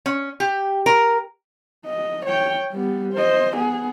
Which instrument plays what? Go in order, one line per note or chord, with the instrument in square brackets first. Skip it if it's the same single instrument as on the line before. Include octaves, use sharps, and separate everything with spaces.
[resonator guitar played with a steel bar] C#4
G4
A#4
[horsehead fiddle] D#5
C#5 G5
G3 B3
C5 D#5
B3 G#4